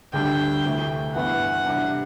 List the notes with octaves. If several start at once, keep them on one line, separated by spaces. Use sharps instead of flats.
D2 D3 G3 D4 G5
D2 C3 E3 A3
G2 E3 B3 E4 F#5
C3 G3 D4